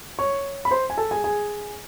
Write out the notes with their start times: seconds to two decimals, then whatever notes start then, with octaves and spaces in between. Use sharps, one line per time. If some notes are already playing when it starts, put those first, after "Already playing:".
0.19 C#5 C#6
0.65 B5
0.71 C5 C6
0.90 G#5
0.97 A4 A5
1.11 G#4 G#5
1.24 G#4 G#5